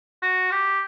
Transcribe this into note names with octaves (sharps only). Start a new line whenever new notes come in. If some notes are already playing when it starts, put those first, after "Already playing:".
F#4
G4